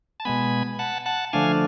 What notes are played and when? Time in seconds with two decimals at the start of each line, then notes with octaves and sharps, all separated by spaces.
0.20 A5
0.25 B2 G#3 B3 G#5 B5
0.79 F#5 A5
1.06 F#5 A5
1.33 D3 F3 A3 D4 F5 G#5